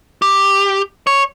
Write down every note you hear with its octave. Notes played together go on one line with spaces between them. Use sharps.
G4
C#5